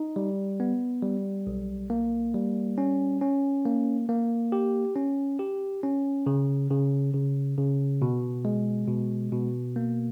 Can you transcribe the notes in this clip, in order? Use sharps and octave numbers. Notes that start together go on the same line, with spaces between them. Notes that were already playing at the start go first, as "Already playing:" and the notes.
Already playing: D#4
G3
B3
G3
B1
A#3
G3
C#4
C#4
A#3
A#3
G4
C#4
G4
C#4
C#3
C#3
C#3
C#3
B2
G#3
B2
B2
A#3